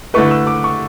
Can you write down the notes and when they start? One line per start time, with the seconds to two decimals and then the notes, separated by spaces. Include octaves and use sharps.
0.14 D3 A3 E4 B4 C#6
0.31 E6
0.47 D6
0.64 C#6